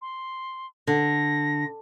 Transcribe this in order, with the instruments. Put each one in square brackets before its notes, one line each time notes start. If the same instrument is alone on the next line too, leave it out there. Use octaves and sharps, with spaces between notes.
[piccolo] C6
[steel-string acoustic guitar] D3 [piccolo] A#6